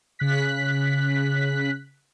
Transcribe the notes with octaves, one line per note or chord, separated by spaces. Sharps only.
C#3 F#6 B6